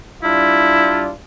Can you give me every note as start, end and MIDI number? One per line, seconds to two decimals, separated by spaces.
0.23 1.12 55
0.23 1.12 62
0.23 1.12 64
0.23 1.12 65